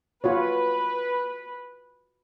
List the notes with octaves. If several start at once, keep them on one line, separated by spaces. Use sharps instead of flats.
F4 F#4 B4 C#5